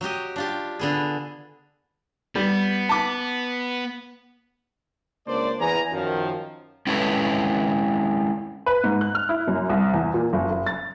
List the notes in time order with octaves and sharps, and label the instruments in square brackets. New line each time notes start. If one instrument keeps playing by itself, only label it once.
[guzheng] F#3 F#4 G4 D#5
D4 F4 G4
D3 B3 G#4
[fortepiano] G3 [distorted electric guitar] B3
[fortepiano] A5 D6
[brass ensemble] C#2 A#3 D4 C5 D5
E2 G#5 A#5
F#2 D#3 F3
[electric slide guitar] G#3 C#4 E4 A4 B4 C#5
[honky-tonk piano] B4
G#2
F#6
F6
E4
F#2
C2
E2
A#2
F#1
F#1
A6